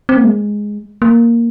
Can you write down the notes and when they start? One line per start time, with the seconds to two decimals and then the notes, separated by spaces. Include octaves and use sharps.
0.09 C4
0.17 A#3
0.24 G#3
1.02 A#3